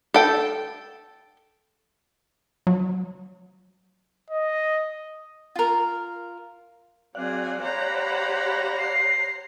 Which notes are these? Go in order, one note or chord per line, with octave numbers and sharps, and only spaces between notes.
A4 G5
F#3
D#5
F4 A#4
F#3 C4 G#4 D5 F5 F#6
G4 C5 C#5 F#5 A#5 B5
C7